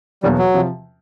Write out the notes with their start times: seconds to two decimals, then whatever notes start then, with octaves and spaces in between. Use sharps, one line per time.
0.23 E2 B2 F#3 G3 A#3
0.38 F#3
0.54 C3 F3